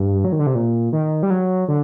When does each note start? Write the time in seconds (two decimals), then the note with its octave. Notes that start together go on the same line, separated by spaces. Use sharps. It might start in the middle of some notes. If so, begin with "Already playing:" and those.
Already playing: G2
0.24 F#3
0.32 D#3
0.39 D3
0.47 C3
0.55 A#2
0.93 D#3
1.23 G3
1.30 F#3
1.68 D3